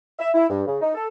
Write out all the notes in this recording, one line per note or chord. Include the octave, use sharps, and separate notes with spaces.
E5
E4
G2
C#3
D#4
A4